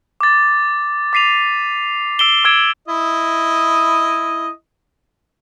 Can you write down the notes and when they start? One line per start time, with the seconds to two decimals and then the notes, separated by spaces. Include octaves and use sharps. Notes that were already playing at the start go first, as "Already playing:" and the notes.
0.21 D6 A6
1.13 D6 B6 C7 D#7 F7
2.19 E6 C7 D7 E7 G7
2.44 D6 E6 G#6 D7 E7
2.88 E4 D#5